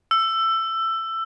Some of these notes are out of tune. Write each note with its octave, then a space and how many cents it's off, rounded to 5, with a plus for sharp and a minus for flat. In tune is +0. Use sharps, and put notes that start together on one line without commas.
E6 +15